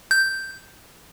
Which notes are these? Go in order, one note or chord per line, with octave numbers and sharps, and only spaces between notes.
G6